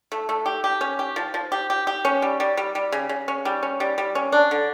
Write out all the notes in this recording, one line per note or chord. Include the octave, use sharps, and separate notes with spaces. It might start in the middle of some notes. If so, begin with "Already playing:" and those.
A3
A3
G4
G4
C#4
G4
F3
F3
G4
G4
G4
C#4
G3
G3
G3
G3
C#3
C#3
C#4
G3
C#4
G3
G3
C#4
D4
D3